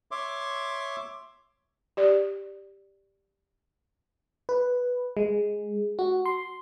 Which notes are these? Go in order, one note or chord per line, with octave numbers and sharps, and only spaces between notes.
C#5 E5 C6 D6
G4 D5
B4
G#3
F#4
C6